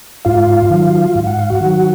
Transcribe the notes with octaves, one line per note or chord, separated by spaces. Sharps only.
G#2 F4 F5
D#3 F#3
G#2
F#5
F5
F#4 F#5
D#3 F#3